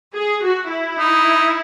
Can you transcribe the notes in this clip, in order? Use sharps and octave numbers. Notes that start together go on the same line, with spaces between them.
G#4
F#4
E4
D#4